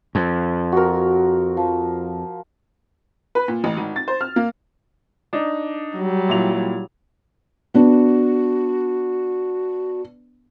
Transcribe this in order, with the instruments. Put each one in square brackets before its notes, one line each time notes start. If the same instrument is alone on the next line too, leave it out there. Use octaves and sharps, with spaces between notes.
[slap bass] F2
[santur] F#4 A#4
F3
[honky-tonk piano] B4
A#2
A1
G#1
A6
C5
F6
A#3
[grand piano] D4 D#4
[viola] F#3 G3
[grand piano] A#2 E4 F7
[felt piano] B3 D4 [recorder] F#4